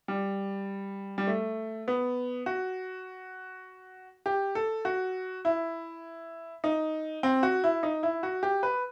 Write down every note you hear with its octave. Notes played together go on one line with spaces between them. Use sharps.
G3
G3
A3
B3
F#4
G4
A4
F#4
E4
D#4
C4
F#4
E4
D#4
E4
F#4
G4
B4